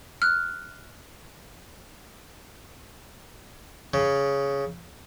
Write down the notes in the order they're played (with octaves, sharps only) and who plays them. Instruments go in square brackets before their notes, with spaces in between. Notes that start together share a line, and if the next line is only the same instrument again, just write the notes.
[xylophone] F6 F#6
[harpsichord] C#3